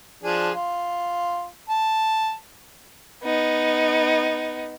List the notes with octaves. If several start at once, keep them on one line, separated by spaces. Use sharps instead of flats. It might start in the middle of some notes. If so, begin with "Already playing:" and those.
F3 D4 G#4
F4
A5
B3 D#4